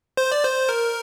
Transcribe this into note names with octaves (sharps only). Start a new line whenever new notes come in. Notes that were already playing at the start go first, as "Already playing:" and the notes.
C5
D5
C5
A#4